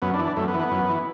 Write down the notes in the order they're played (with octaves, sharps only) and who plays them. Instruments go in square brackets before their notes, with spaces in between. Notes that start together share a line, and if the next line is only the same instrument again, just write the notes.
[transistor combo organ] F#2 B3
D4
E3
D4
F#2 A3
B3
E3
B3
F#2
E3